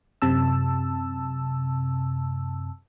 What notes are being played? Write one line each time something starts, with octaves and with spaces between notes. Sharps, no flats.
F#2 C3 A5 E6